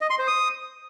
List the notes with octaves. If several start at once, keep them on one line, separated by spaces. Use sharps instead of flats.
D#5
C6
C5
D#6